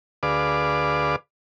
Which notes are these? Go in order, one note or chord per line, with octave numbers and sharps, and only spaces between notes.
D2 G#4 B4 D5 F5 D6